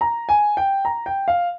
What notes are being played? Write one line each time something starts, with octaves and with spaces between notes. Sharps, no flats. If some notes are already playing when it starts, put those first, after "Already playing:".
A#5
G#5
G5
A#5
G5
F5